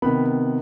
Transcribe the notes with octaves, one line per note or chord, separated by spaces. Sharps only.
C3 D#3 B3 B5